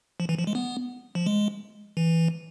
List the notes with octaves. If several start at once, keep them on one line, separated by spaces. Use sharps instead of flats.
F3
E3
F3
G#3
B3
F3
G#3
E3